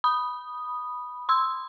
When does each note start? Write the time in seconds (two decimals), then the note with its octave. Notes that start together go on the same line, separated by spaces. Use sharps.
0.04 B5 D#6
1.29 C6 E6